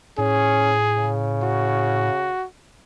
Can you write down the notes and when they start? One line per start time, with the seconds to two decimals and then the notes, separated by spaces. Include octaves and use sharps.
0.19 A2 C#4 G#4
0.96 C#3
1.43 F#4